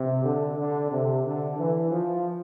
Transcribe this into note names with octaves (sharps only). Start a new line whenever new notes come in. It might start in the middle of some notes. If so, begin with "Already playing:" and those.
Already playing: C3
D3
D3
C3
D3
E3
F3